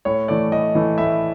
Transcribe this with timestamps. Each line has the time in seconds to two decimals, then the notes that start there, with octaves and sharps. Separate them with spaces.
0.05 A2 C#5
0.28 E3 A3 D5
0.51 A2 D#5
0.75 E3 A3
0.98 A2 E5